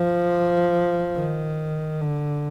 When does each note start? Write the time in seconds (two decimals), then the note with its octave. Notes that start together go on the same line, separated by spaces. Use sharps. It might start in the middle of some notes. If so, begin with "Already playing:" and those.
Already playing: F3
1.16 D#3
2.01 D3